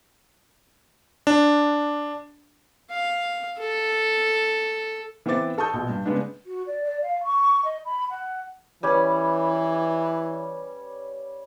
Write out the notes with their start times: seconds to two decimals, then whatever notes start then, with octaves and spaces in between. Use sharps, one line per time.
1.27 D4
2.90 F5
3.59 A4
5.26 E3 B3 C4 C5 D6 A6
5.58 A4 A5 C#6 D#6 G6
5.74 A#1 B2
5.89 G2
6.06 C#3 G#3 B3 D4
6.46 F#4
6.66 D5
6.84 D5
7.02 F5
7.24 C#6
7.64 D#5
7.85 B5
8.10 F#5
8.83 E3 G3 C#4 B4